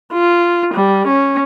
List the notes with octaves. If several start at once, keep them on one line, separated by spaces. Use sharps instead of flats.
F4
G3
C#4